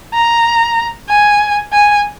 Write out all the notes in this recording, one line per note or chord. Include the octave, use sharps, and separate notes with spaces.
A#5
G#5
G#5